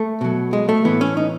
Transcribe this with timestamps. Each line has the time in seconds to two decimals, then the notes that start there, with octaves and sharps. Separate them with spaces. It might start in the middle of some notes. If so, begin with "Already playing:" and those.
Already playing: A3
0.21 B2 F#3
0.53 G#3
0.69 A3
0.85 A2 E3 B3
1.01 C#4
1.17 D#4